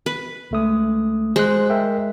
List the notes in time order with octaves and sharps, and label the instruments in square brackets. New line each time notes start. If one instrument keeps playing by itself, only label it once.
[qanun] B4
[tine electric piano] C#2 A3 D#6
[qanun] G#3 [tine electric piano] C5 F#6
[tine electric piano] A#4 E5 G5